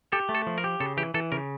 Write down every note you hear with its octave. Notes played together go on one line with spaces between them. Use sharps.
G4 A4
A3
A4
F3
A#4
G4
C#3 A4
E3 G4
E3 A4
C#3 A#4